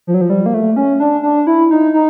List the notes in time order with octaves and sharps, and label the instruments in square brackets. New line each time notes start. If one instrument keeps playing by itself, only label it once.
[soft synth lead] F3
F#3
F3
G3
A#3
A3
C#4
D4
D4
E4
D#4
D#4